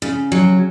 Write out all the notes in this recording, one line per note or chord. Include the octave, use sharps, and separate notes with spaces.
C#3
F#3